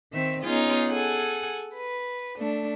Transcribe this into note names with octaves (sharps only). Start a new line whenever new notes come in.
D#3 C4 E5
B3 C#4 D#4 F4 G#4
G#4 A4 F#5 G#5
B4
A3 D4